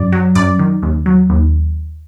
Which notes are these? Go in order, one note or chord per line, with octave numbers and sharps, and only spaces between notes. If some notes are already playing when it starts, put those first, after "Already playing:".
Already playing: F#2 D5
F#3
F#2 D5
D#3
D#2
F#3
D#2